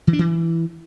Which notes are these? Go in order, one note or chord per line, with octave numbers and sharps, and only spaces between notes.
E3
D4
E3